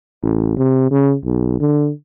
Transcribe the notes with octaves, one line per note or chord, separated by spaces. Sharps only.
A1
C3
C#3
B1
D3